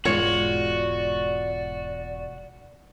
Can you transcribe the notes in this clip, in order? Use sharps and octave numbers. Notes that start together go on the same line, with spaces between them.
E1 G#2 G#3 F4 F#4 C#5 D5